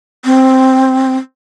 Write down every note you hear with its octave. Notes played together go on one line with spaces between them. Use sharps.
C4